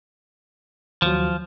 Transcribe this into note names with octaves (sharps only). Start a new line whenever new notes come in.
D#2 F3 F#3